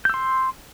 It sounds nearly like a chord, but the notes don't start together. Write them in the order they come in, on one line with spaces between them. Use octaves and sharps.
G6 E6 C6